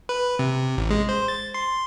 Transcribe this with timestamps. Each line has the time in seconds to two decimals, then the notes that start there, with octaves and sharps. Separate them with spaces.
0.09 B4
0.39 C3
0.77 A1
0.90 G#3
1.09 C5
1.28 A6
1.54 C6